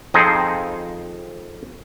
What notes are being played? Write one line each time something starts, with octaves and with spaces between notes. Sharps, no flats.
F2 F3 C4 D#4 G#4 C5